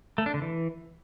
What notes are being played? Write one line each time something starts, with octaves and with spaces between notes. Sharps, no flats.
A3
D4
D3
E3